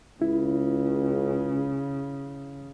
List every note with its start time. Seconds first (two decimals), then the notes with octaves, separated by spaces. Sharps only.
0.22 C#2 C#3 E4